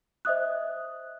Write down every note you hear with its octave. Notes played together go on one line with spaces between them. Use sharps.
C5 D#5 E5 D#6 F#6